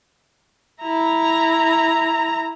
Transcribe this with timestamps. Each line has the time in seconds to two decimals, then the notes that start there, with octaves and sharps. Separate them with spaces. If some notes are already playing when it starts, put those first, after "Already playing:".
0.82 E4 A#5